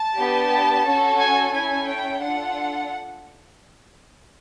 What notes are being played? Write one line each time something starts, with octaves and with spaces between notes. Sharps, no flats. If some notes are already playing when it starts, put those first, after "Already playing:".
Already playing: A5
B3 D4 G4
C#4 F#4 A4
G#5
C#4 E4 A4 G#5
G5
D4 F4 A4 F#5